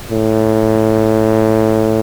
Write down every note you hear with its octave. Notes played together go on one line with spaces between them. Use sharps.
A2